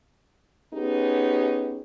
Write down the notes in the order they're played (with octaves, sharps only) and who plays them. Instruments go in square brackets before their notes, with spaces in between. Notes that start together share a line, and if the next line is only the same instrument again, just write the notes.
[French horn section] B3 C#4 D#4 G4 G#4